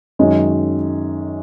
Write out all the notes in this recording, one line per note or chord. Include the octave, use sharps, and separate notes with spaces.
F#2 D#3 G#3 C#4